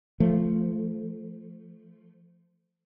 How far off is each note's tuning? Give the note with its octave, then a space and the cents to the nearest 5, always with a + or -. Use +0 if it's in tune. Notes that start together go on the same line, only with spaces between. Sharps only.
F3 -15 A3 +0